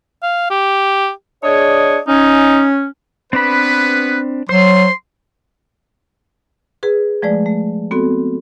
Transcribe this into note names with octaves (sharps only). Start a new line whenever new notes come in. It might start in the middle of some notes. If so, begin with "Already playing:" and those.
F5
G4
D4 G#4 C#5 D#5
C#4 D#4
B3 C4 D4 B4 B5
F#3 C5 C6
G#4 B4
F3 G#3 A3 D5
A3
B3 C4 F#4 A4